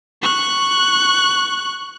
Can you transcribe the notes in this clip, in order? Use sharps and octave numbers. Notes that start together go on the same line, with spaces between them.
C#6 F#6